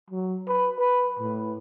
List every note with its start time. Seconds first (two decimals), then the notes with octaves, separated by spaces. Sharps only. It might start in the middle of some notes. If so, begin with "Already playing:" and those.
0.11 F#3
0.47 B4
0.79 B4
1.19 A2